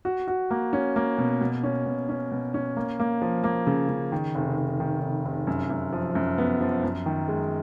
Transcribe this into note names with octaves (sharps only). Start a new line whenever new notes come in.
F#4
F#4
A#3
C#4
A#3
B2
B2
C#4
B2
C#4
B2
C#4
A#3
A#3
F3
A#3
C#3
C#3
D#3
F1
F1
D#3
F1
F1
F#2
F#2
F3
F#2
B3
F3
F#2
D#3
G#3